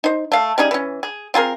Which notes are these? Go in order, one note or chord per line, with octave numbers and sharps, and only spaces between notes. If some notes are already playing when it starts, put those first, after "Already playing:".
D#4 C5
A3 F5
G3 C#4 D#4 G#4
E3 C#4
G#4
C4 F4 G#4 A#4